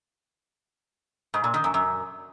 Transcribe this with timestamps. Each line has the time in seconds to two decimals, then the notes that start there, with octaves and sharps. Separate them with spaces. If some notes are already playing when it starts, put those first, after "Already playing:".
1.34 G#2
1.44 A#2
1.54 D#3
1.64 F#2
1.74 F#2